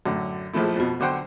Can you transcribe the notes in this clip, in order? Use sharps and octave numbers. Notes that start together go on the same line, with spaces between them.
F#2 A2 D3
A#1 F3 G#3 A3 E4
F2 B2
B1 D3 F#4 C5 F#5 G5